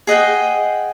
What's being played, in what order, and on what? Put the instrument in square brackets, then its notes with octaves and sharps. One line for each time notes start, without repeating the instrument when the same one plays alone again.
[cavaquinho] G#4 D#5 F#5 G5